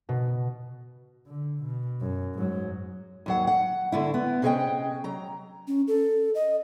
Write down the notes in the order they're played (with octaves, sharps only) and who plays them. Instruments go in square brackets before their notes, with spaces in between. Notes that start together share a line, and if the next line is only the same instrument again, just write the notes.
[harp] B2
[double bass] D3
B2
F#2
G#2 F#3
[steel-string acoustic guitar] D#2 F#3 F#5
F#5
D3 A3 E4
B3
C3 C#4 G#4 B4 D#5 G5
F#3 A#5
[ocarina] C#4
A4
D#5